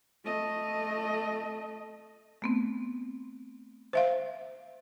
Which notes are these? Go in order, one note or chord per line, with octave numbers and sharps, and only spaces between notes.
A3 D#5
A3 B3 C4
C5 E5 F5